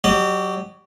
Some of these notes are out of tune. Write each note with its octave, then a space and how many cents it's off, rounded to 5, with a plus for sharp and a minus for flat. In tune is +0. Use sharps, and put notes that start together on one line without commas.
F#3 +15 G4 +0 D#5 -35